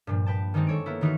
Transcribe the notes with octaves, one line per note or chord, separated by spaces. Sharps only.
G2 A#2 F3
B4 G5 A5
D#3 G3 G#3 C4 D#4
A4 C#5 D7
A#3 B3 E4
D#3 E3 D#4 F4 F#4 B4